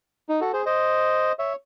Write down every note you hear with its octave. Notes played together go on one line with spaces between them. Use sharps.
D#4
F#4 A4
G#4 C5
C5 D#5
C#5 E5